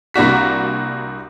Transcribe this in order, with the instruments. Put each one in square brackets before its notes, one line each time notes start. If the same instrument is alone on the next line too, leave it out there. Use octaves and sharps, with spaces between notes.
[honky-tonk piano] C2 A#3 D4 F#4 B6